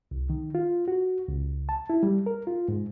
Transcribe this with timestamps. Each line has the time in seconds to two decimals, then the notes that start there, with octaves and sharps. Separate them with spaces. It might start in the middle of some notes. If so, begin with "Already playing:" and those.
0.11 C2
0.30 D#3
0.55 F4
0.88 F#4
1.28 C#2
1.69 A5
1.90 E4
2.03 G3
2.26 A#4
2.47 F4
2.68 G#2